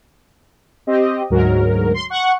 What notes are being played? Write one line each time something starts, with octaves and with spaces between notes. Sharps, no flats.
C4 G4 D#5
D2 G#2 F#3 A#4
C6
F#5 C#6